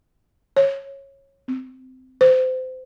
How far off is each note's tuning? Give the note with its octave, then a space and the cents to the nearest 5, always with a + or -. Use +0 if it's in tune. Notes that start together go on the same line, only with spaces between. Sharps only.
C#5 -15
C4 -20
C5 -25